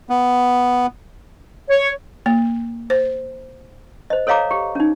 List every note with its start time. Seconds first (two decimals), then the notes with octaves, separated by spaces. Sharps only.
0.09 B3
1.69 C#5
2.26 A#3
2.90 C5
4.10 C5 D#5
4.27 A4 C#5 D#5 F5 A#5 D6
4.51 G4
4.75 C#4 D#4